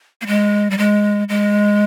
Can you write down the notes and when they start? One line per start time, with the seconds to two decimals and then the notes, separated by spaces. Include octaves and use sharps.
0.21 A#3
0.27 G#3
0.70 G3
0.78 G#3
1.29 G#3